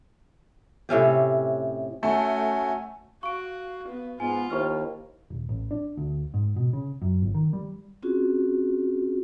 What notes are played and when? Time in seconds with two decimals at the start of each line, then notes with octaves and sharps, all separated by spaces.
0.89 A2 C3 C#4 G4
2.03 A3 C#4 F#4 G#5
3.23 F#4 F5 C#6 D7
3.88 B3
4.20 G#2 B3 F4 G#5
4.50 D#2 E4 C5 C#6 F6
5.30 D#1
5.49 A1
5.71 D4
5.97 D2
6.34 G#2
6.56 B2
6.73 C#3
7.02 F#2
7.22 G1
7.35 D#3
7.53 G3
8.02 C4 C#4 F4 F#4 G#4